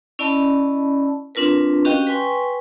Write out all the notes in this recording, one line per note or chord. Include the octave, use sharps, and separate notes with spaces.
C#4 E4 D5 D#5 A5 B5
C4 D4 F4 A#4 B4
C#4 F#4 G4 D#5 F5 G5
B4 G5 G#5 C6 C#6